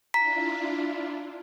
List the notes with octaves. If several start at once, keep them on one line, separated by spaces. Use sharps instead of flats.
D4 E4 F4 A#5 B6